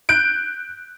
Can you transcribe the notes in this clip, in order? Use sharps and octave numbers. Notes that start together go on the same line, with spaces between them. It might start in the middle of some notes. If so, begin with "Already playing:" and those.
F#6 G6 D7